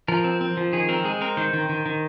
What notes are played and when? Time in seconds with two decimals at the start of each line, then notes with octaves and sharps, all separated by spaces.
0.08 F3 A#4
0.24 C4
0.41 C4
0.57 F3
0.73 D#3 G#4
0.89 C4 A#4
1.04 G#3 G#4
1.21 C4 A#4
1.37 D#3 C5
1.53 D#3
1.69 D#3
1.86 D#3